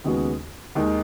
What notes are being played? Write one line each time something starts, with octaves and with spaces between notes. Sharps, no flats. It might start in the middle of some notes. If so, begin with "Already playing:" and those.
D#2 C#3 G#3 B3 F#4
D#2 D#3 G#3